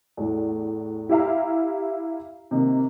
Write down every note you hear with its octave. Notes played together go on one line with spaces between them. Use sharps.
E2 A2
E4 G4 E5 F5 A#5
C3 D#3 A#3